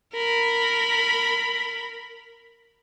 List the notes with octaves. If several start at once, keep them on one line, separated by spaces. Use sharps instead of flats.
A#4 B5